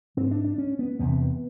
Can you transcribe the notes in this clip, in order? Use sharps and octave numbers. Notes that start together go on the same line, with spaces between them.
G#2 C4
D4
D4
C#4
B3
E2 C3 B3